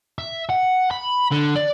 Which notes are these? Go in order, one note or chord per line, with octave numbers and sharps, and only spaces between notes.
E5
F#5
B5
D3
D5